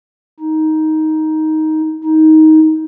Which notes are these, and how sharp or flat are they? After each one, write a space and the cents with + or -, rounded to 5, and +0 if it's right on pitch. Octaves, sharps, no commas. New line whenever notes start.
D#4 +10
D#4 +15